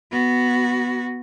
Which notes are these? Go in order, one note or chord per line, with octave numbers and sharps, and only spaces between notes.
B3 F#4